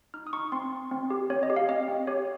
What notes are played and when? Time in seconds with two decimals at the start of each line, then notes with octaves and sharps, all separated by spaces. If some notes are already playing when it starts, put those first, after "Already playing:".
0.14 D#4 F6
0.27 D#6
0.33 D#4 C#6
0.52 C4 C6
0.73 C4
0.91 C4
1.10 G4
1.30 C4 C#5
1.43 D#5
1.50 G4
1.56 F5
1.69 C4 D#5
1.88 C4
2.07 G4 C#5